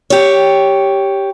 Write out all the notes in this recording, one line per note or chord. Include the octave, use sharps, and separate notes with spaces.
G4 C#5